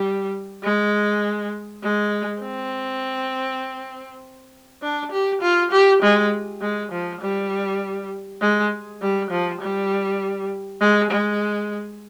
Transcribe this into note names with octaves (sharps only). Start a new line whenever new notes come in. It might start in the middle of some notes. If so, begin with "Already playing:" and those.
Already playing: G3
G#3
G#3
C4
D4
G4
F4
G4
G#3
G#3
F3
G3
G#3
G3
F3
G3
G#3
G#3